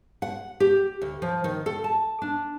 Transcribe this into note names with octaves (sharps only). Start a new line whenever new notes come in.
F#5
G4
D2
F3
D#3
A4
A5
D4